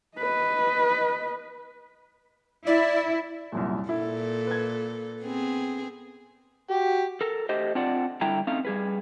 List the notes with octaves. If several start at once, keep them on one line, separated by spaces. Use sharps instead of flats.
B4 D#5
E4 D5
C2 F#2 A#2
A#2 E4 A4
B4 G#6
B3 C4 G#4
F#4 G4
A4 A#4
A3 G4 C5 D#5
C4 D4 F4 D5 F#5
D3 G3 E4 E5 G5 A#5
A3 C4 C#4 D#4 F5
G3 G#4 B4